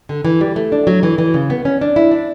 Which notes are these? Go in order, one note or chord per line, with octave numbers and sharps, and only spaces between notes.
D3
E3
G3
A3
D4
F#3
E3
E3
C#3
B3
C#4
D4
E4
D4